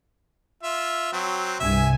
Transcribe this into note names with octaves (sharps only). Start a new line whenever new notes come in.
F4 E5
F#3 C4
C2 G2 E5 G#5